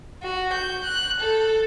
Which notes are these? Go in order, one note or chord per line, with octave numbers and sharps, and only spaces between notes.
F#4
G6
F#6
A4